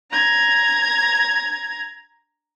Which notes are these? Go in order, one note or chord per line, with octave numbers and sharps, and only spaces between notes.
A#5 G#6